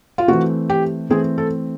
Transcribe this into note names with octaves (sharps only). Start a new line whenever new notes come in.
F4
E3 A3 C4 F#4
G4
E3 A3 C4 G#4
A4